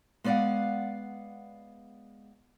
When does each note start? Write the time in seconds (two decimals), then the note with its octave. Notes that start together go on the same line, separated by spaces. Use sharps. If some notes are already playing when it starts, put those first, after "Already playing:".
0.24 G#3 B3 D5 F5 F#5